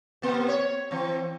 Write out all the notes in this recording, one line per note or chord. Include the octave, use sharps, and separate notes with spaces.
C3 A#3
C#5
E3 C4